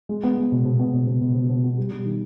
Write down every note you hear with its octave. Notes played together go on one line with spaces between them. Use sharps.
G#3
B3
G#3
B2
B2
B3
B2
B2
B2
B2
B2
B3
G3
G3
D#3